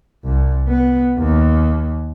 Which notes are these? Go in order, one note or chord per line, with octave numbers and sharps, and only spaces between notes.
C2
B3
D#2